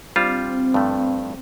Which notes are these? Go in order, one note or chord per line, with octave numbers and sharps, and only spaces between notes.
G3 C4 D4 F4 C5
G2 F3 A3